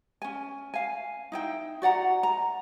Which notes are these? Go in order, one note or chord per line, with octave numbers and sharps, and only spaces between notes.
C#4 G#5
F5 G#5
D#4 E4 G5
F#4 D5 F#5 A#5
A#5